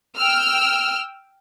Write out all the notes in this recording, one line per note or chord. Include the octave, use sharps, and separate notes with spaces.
G5 E6 F6